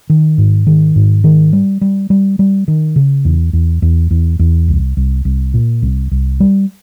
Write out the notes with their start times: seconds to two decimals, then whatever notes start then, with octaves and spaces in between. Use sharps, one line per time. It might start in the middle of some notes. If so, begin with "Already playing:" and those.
0.10 D#3
0.38 G#2
0.67 D#3
0.96 G#2
1.24 D#3
1.53 G3
1.81 G3
2.10 G3
2.39 G3
2.68 D#3
2.96 C#3
3.25 E2
3.53 E2
3.82 E2
4.11 E2
4.39 E2
4.68 C2
4.97 C2
5.25 C2
5.54 A#2
5.82 C2
6.11 C2
6.40 G3